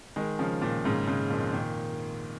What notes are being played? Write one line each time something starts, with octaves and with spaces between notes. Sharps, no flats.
D#3 G#3
C#3 F3
A#2 D#3
G#2 C#3
G#2 C#3
F2 A#2
A#2 D#3